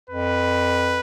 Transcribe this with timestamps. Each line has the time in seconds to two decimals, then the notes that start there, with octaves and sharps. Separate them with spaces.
0.10 F2 B4